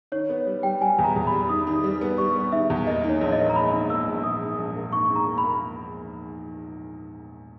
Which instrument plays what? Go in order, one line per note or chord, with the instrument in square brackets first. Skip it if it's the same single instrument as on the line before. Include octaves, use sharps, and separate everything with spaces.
[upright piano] D#3 [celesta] C#5
[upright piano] B3 [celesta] C#5
[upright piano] G3
[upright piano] G3 [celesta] G5
[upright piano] G3 [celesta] G#5
[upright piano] E2
[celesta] A#5
[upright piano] E2
[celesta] B5
[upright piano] G3
[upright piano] D#3 [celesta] D#6
[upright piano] D#3
G3
B3
[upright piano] G3 [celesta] C#6
[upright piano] B3
[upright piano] D#3 [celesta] E5
[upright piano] E2
[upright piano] A#3 [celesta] D#5
[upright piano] D#3
[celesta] C#5
[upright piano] A#1 [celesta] C#5
[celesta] D#5
[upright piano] A#3
[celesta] A#5
[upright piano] G#2 [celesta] B5
[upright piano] D#3
[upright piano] A#3 [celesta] E6
[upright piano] A#1
[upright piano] A#1 [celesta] D#6
[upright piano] G#2
A#1
A#3
[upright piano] G#2 [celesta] C#6
[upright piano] G#2
[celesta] A#5
[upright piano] A#3
[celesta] B5
[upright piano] A#3